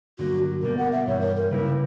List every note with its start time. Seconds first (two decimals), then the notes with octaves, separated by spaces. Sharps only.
0.19 G2 D3 F#3 A#3 F#4
0.62 B2 G3 A#3 A#4
0.78 F#5
0.92 E5
1.07 G2 E3 G3 C#5
1.21 A#4
1.36 A#4
1.51 C#3 G3 A#3 E4 B4